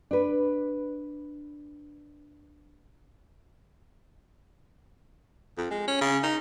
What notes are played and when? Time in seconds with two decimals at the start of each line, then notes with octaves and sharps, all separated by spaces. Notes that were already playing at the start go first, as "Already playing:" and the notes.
0.11 D4 B4
5.58 F2
5.71 G#3
5.88 C#4
6.01 C#3
6.23 D#4